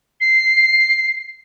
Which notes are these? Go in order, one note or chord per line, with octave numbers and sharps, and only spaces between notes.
C7